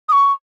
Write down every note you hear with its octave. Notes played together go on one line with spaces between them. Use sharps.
D#6
C#6